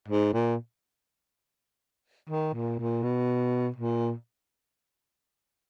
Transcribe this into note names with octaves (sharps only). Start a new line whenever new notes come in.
G#2
A#2
D#3
A#2
A#2
B2
A#2